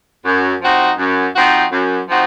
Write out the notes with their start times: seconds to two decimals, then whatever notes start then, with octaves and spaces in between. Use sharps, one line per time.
0.25 F#2
0.62 F3 C4 D#4 F#4
0.98 F#2
1.35 F3 C4 D#4 F#4
1.72 F#2
2.09 F3 C4 D#4 F#4